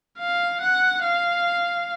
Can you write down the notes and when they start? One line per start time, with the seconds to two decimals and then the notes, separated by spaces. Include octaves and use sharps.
0.18 F5
0.61 F#5
1.03 F5